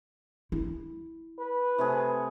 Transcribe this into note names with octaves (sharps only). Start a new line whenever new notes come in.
E4
B4
C3 A3 G#4